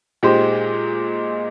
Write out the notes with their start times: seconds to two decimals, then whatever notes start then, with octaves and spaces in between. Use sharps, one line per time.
0.23 A#2 G#3 D#4 G4 C5